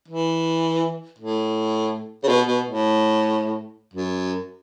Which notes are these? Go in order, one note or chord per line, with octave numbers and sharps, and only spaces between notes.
E3
A2
C#3
B2
B2
A2
F#2